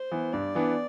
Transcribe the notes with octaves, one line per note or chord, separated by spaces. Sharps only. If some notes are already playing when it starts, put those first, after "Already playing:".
Already playing: C5
E3 B3
G2 D5
E3 B3 D4